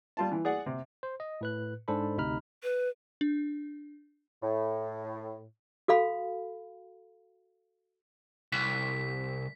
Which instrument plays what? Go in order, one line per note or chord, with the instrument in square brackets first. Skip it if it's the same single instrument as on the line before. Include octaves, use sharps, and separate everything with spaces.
[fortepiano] G3 F4 A5
E3
G#4 D5 F#5
C3
[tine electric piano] C5
D#5
A2 B4 F#6
G#2 D4 A4 C5 B5
D2 C3 D#4 B5 F6
[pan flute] B4
[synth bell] D4
[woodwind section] A2
[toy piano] F#4 A4 F5 B5
[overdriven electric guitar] C2 [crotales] B6